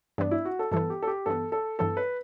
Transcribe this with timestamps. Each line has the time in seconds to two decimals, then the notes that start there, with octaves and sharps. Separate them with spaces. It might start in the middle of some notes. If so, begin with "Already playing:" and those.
0.18 G2 E3 B3 D4
0.31 E4
0.45 F#4
0.59 A4
0.72 G2 E3 B3 A4
0.90 G4
1.02 A4
1.07 G4
1.26 G2 E3 B3 A4
1.52 A4
1.79 G2 E3 B3 A4
1.97 B4